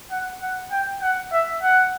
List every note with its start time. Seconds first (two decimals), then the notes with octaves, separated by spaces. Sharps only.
0.11 F#5
0.41 F#5
0.71 G5
1.02 F#5
1.32 E5
1.62 F#5